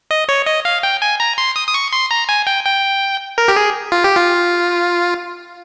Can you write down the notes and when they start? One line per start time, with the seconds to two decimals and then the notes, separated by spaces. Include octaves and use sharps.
0.11 D#5
0.29 C#5
0.46 D#5
0.65 F5
0.83 G5
1.02 G#5
1.20 A#5
1.38 C6
1.56 D#6
1.67 D#6
1.74 C#6
1.93 C6
2.11 A#5
2.29 G#5
2.47 G5
2.65 G5
3.38 A#4
3.48 G4
3.56 G#4
3.92 F4
4.04 G4
4.16 F4